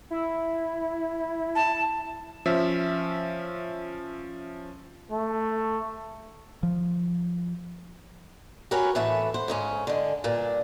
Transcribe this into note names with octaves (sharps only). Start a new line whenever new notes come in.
E4
A5
F3 C#4 E5
A3
F3
F#4 G4 A#4 B4 C#5 G#5
A2 E3 A3 B4 E5 F#5
C5 F#5
G#2 C#3 C#4
D3 G#3
G2 A#2 D4